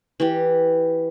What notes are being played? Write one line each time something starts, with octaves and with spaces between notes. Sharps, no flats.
E3 G4